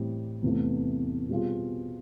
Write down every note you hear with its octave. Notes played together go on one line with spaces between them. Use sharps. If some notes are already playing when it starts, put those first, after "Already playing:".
Already playing: A2 E3 G3 C4
E2 C3 E3 A3
B2 G3 C4 F4 G#4